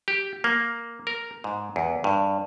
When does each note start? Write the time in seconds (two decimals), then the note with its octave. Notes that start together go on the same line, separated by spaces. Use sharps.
0.08 G4
0.44 A#3
1.07 A#4
1.44 G#2
1.76 E2
2.04 G2